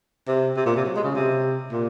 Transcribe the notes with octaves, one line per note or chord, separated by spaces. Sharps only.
C3
C3
A#2
C3
F#3
G#3
C#3
C3
A#2